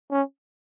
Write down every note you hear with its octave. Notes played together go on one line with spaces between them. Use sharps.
C#4